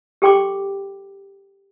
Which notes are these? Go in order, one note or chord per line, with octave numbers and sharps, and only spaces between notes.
G4 A4 G5 C6 D6